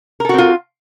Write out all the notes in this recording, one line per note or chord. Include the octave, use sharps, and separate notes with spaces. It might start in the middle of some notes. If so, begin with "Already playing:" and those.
C4 F4 F#4 A4 A#4